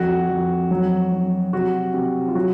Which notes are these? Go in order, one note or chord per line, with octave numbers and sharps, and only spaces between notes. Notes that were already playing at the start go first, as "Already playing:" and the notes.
Already playing: F2 F#4
F2
F#3
F#3
C3 F#4
C3
F4
F#3 F#4